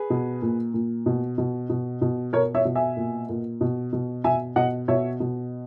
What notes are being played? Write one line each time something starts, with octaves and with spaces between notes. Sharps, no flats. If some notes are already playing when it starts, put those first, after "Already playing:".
Already playing: G#4 B4
B2
A#2
A#2
B2
B2
B2
B2
B2 A#4 C#5
C#5 E5
B2
E5 G#5
A#2
A#2
B2
B2
B2 E5 G#5
B2 D#5 F#5
B2 C#5 E5
B2